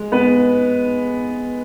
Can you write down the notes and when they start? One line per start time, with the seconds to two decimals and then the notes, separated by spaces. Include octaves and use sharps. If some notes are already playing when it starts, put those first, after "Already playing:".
Already playing: G#3
0.12 B3 B4